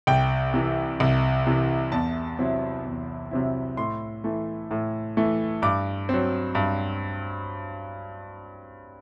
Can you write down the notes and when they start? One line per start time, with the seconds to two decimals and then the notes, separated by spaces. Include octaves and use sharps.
0.07 C2 G5
0.54 C3 E3
1.00 C2
1.47 C3 E3
1.92 E2 A5
2.39 C3 F#3 C4 E4
2.85 E2
3.31 C3 F#3 C4 E4
3.77 A2 C6
4.24 E3 A3
4.71 A2
5.17 E3 A3
5.62 G2 D6
6.09 F#3 C4
6.55 G2